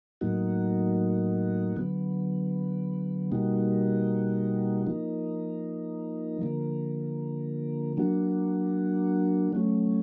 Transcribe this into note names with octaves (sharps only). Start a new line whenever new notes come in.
A2 F#3 A#3 D#4 F#4
D3 F#3 B3
B2 G3 A#3 D#4 F#4
F3 A#3 D#4
D3 F3 A#3
F#3 A#3 D4 F#4
F#3 A3 C#4